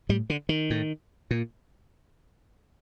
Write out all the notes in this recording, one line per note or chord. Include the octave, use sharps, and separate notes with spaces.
A2 G3
D3
D#3
A2
A#2